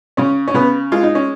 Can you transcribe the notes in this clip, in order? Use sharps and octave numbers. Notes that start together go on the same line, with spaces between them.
C#3 C#4
C#4
C#3 B3
G#3 F4
D#4
C#4